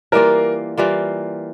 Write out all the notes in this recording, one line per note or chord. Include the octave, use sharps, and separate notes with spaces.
E3 G3 A#3 F4 A#4
E3 G3 A#3 F4